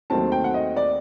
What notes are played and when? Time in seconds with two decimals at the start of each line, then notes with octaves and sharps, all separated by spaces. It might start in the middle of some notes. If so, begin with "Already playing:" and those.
0.10 D#2 D#3 F#3 A3 C4 A5
0.32 G5
0.44 F#5
0.54 D#5
0.76 D5